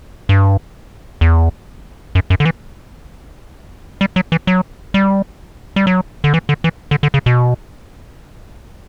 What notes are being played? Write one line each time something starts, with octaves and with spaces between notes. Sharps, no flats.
G2
E2
F#2
F#2
D3
E3
G3
F#3
E3
F#3
G3
G3
F#3
D3
E3
D3
E3
D3
D3
C#3
B2